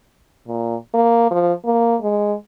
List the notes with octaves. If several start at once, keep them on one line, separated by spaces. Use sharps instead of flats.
A#2
A#3
F3
A#3
G#3